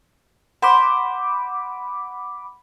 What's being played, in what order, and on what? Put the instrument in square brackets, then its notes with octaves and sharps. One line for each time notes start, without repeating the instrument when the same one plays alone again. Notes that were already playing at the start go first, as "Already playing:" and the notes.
[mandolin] C5 [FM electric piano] F#5 B5 D6